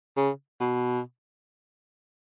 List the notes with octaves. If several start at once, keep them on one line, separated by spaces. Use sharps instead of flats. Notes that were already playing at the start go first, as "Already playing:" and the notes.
C#3
B2